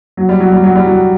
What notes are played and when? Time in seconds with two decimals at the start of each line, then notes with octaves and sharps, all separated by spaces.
0.17 F#3
0.29 G3
0.40 F#3
0.52 G3
0.64 F#3
0.75 G3
0.86 F#3